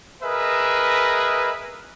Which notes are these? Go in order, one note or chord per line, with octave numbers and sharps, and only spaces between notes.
G#4 A#4 B4 D#5 E5